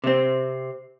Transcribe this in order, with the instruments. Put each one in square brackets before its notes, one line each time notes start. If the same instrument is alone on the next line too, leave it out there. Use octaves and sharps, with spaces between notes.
[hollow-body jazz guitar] C3 C4